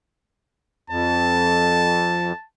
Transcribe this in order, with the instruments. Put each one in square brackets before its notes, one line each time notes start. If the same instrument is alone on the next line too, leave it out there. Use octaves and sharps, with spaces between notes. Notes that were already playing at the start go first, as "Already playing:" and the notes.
[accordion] F2 [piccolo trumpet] A5